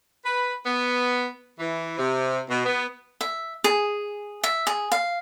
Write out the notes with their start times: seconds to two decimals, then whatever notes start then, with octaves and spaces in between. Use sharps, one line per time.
0.25 B4
0.66 B3
1.59 E3
1.98 C3
2.50 B2
2.65 B3
3.21 E5
3.64 G#4
4.43 E5
4.67 G#4
4.92 F5